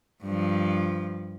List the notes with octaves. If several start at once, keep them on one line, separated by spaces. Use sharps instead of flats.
G2 F3